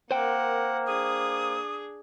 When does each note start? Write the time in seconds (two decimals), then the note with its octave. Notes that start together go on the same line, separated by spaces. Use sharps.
0.11 A#3 A#4 C5 F#5 G5
0.87 D4 G#4 D#6